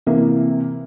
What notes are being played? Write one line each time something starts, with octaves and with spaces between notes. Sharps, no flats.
C3 E3 A#3